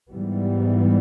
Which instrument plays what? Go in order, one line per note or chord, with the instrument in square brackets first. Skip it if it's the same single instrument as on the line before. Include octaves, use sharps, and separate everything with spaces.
[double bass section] G#2 E3 G3 B3